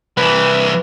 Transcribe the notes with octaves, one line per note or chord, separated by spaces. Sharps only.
C2 E3 B4